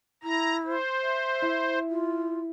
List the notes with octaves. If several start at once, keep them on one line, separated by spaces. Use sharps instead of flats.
E4 A#5
C5
E5
E4
F4